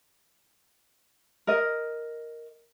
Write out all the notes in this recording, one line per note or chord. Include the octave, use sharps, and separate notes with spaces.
A#4 D#5